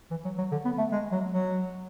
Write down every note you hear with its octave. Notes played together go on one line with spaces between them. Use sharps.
E3
F#3
F#3
D3
B3
A3
G#3
F#3
F#3